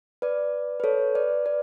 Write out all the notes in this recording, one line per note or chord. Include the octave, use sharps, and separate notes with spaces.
B4 D5
B4
A4 C#5
B4 D5
B4 D5